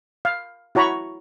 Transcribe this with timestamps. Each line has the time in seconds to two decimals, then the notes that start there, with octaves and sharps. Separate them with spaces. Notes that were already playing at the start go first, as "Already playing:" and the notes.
0.25 F5
0.75 E4 F#4 C#5 A#5 B5 C#6